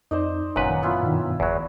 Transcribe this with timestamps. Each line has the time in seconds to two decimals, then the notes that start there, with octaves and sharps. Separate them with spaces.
0.11 F2 D#4 C5 D5 D#5
0.56 G1 F#2 A#2 B4 F#5
0.69 D#3
0.83 B3 E4 F4
1.03 G2 B2 D#3
1.40 F#1 E2 F#3